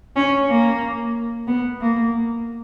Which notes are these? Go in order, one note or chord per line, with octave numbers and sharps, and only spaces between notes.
C#4
A#3
B3
A#3